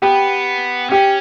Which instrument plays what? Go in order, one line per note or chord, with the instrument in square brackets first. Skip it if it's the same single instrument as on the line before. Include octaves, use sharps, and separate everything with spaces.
[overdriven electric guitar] B3 [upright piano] G4
[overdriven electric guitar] C#4 [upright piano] G4